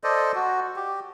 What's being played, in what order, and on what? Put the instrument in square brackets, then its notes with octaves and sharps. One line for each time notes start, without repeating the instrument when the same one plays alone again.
[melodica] A4 C5 D5 D#5
F#4
G4